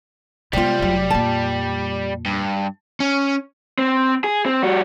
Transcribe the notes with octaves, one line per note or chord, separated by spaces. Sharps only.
C3 G3 G#3 B3 F4
F1 F#3
F2 A#2 A5
G2
C#4
C4
G#4
C4
G3 F#4